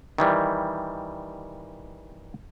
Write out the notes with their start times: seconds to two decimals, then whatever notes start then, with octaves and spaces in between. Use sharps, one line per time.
0.18 D#3 E3 G3